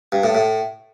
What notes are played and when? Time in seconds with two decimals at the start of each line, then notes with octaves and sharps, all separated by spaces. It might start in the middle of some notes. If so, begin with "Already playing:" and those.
0.12 G2
0.24 A2
0.35 A2